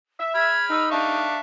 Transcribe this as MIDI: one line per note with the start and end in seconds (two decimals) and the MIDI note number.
0.20 0.51 76
0.35 0.86 83
0.35 0.86 89
0.35 0.65 92
0.70 1.26 63
0.70 0.91 88
0.91 1.40 62
0.91 1.40 76
0.91 1.40 77
0.91 1.40 85